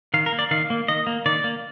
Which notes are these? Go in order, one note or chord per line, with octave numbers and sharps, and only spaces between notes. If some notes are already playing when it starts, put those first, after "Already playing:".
D#3 F5
A#4
A#3
D5
D#3 F5
A#3
D#3 D#5
A#3
D#3 D5
A#3